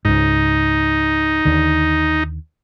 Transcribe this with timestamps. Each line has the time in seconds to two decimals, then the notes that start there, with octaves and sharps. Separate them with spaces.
0.05 C#2 G#2 D#4
1.45 D#2 D3